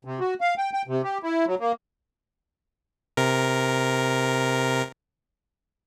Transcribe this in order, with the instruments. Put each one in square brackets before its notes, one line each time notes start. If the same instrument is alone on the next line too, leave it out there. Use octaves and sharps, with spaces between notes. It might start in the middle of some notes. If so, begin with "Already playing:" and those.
[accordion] C3
F#4
F5
G5
G5
C3
G4
E4
F#3
A#3
[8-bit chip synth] C3 A#4